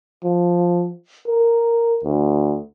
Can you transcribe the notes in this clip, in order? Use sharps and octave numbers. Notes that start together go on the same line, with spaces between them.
F3
A#4
D2